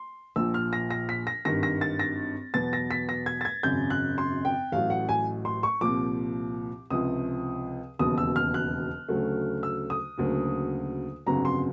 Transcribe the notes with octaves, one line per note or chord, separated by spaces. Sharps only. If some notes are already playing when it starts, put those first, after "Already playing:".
Already playing: C6
A#1 A#2 F3 E6
F6
A#6
A#6
B6
A#6
G#1 G2 D#3 A#6
A#6
A6
A#6
E2 B2 F#3 B3 A6
A#6
B6
A#6
G#6
A6
G#6
G#1 F#2 C#3 G6
F#6
C6
G5
A1 A2 F#3 F5
F#5
G#5
C6
C#6
C2 A#2 F3 D6
C#2 C3 F3 D#6
E1 D#2 C#3 F#3 B3 D#6
E6
F6
F#6
D2 C#3 F#3 A3
E6
D#6
D2 C#3 F#3 A#3
G1 F2 C#3 F#3 A#5
C6